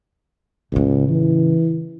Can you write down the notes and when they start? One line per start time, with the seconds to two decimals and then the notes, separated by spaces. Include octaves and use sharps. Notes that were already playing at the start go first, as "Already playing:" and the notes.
0.72 C#2 A2 C#3
1.09 E3